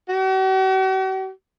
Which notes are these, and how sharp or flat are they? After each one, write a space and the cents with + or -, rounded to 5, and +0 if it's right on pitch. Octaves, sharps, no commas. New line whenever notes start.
F#4 +45